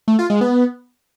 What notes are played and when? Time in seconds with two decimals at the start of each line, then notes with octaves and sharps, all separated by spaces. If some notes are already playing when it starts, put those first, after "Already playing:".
0.08 A3
0.19 F4
0.30 G#3
0.41 B3